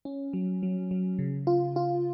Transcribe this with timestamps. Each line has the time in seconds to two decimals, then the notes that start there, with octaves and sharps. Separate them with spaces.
0.05 C#4
0.33 F#3
0.63 F#3
0.91 F#3
1.19 C#3
1.47 F4
1.76 F4